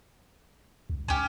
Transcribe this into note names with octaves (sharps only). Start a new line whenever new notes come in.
C#2
C#2 C#4 G4